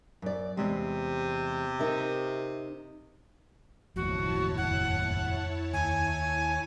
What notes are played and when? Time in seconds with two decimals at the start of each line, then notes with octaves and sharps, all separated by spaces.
0.22 F#2 D5
0.57 E2 C3 G#3
1.79 D#4 A#4 E5
3.96 F#1 D#2 A2 F3 E4 F#4 C#5 A5
4.57 F2 F#5
5.73 D#2 G#5